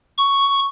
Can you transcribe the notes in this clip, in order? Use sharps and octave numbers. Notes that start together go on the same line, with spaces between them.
C#6